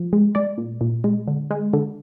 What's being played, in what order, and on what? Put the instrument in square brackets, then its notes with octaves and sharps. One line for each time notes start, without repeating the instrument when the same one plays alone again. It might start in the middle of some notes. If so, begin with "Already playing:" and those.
Already playing: [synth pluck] F3
G#3
G#3 D5
A#2
A#2
G#3
D3
G#3
D3